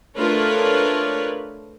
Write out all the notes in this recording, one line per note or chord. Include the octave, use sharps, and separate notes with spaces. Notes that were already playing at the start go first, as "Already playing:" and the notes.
A3 D4 F4 A#4 B4 C#5